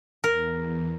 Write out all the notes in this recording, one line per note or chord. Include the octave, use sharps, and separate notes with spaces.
E2 A#4